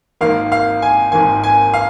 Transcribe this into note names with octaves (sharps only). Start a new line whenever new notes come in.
G#1 G#2 D#3 A#3 F5
F5
G#5
G#1 G#2 D#3 A#3 G#5
G#5
F5